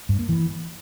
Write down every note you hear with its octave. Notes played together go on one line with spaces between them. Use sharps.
G2
A#3
E3